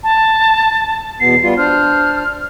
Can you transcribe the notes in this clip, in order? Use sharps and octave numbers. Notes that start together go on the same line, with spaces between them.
A5
E2 B2 B3 C7
G3 B3 F4
D4 C5 F6